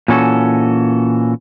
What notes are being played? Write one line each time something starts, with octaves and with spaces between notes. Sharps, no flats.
A#2 E3 C#4 F#4 A4